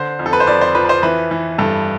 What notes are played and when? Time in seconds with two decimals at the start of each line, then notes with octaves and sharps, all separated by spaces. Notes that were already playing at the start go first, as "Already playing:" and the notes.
Already playing: D3 C5
0.19 F2
0.26 A4
0.33 B4
0.40 C5
0.47 F2 D5
0.61 C5
0.75 F3 B4
0.85 B4
0.89 C5
1.03 E3 B4
1.31 E3
1.58 G2 A4